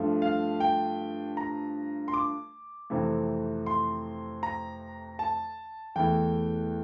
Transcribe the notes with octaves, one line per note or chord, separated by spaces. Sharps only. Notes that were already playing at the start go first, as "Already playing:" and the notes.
Already playing: G2 F3 A3
F5
G5
A#5
C6
D6
F2 C3 E3 A3
C6
A#5
A5
E2 E3 A3 G5